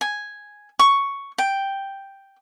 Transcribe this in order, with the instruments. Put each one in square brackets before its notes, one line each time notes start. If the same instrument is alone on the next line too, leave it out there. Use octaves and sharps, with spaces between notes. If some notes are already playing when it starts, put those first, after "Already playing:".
[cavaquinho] G#5
C#6
G5